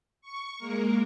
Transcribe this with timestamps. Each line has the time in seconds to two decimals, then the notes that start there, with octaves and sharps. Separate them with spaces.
0.21 C#6
0.58 G#3 A#3 A#4